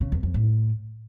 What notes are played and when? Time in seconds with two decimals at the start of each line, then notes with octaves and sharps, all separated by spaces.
0.01 C#3
0.12 E2
0.23 F2
0.34 A2